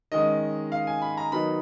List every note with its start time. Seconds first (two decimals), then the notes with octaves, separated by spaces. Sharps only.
0.12 D#3 G#3 C#4 D#5
0.72 F5
0.87 G#5
1.02 B5
1.17 A#5
1.32 D#3 F#3 B3 D#4 B5